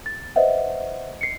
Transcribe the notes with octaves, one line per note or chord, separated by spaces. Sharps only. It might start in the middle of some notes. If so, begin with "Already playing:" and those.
A6
B4 C5 D#5 E5 F#5
C7 C#7